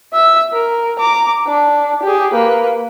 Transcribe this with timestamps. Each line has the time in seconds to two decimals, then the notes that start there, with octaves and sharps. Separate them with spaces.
0.13 E5 E6
0.53 A#4
0.99 A#5 D6
1.47 D4
2.03 G4 G#4
2.33 A#3 B4